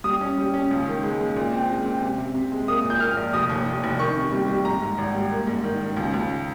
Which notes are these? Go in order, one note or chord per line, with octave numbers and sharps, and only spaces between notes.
G3 D#6
C#4
G3
C#4
C#2
D#3
G#3
G#3
A#2
C4
G#3
C4
C3
C3
C3
G#3
A#3 D#6
A#2
G6
A#3 F6
A#1
F1 D#6
D#2
D#2
F1
D#3 C#6
C3
G3
G3
G#2 A#5
G#2
G#1
G3
A#3
G#2
D#3
D#3
C#2
C#2